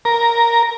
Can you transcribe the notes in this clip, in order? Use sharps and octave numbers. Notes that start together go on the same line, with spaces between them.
A#4